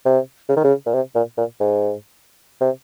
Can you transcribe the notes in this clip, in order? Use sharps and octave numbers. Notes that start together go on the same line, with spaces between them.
C3
C#3
D#3
C#3
A#2
C3
A#2
A#2
G#2
C3